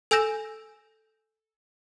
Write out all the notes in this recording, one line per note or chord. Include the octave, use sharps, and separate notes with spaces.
A4 G#5 E6 G6 A#6 E7